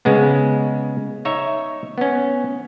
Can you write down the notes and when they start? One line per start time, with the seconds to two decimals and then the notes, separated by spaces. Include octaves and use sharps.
0.05 C#3 G#3 B3
1.25 D#4 C#5 E5
1.98 B3 C#4